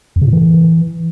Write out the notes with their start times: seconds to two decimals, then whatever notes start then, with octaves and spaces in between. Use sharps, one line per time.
0.16 F2
0.22 C#3
0.27 A2
0.33 E3